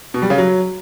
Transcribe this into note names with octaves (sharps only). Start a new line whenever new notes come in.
B2
G3
C#3
F#3